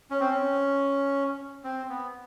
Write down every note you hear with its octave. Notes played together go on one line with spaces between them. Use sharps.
C#4
C4
C#4
C4
B3